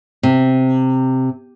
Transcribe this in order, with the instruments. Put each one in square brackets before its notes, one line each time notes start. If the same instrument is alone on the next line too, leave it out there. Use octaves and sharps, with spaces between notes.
[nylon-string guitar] C3